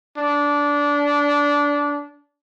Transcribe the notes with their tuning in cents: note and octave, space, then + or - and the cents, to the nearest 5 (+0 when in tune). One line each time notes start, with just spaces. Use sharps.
D4 -20